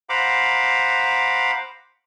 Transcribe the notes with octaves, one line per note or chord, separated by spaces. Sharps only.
C5 F5 F#5 A#5 B5 D6